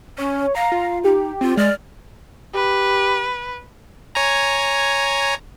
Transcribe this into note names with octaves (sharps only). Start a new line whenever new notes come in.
C#4 C#5
F5 A#5
F4
D#4 G4
C4 F4
G#3 D5 F6
G4 B4
C#5 G#5 A#5